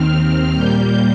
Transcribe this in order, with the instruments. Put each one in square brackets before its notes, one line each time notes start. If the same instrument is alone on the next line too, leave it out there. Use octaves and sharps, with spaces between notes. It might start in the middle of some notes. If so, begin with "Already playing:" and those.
Already playing: [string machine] D#2 D#3 C4 F6
A#2 G3 A#3 G6